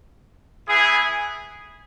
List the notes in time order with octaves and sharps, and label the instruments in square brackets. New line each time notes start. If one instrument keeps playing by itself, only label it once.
[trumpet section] B3 E4 G#4